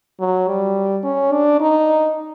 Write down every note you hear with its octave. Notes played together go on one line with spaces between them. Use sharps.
F#3
G3
C#4
D4
D#4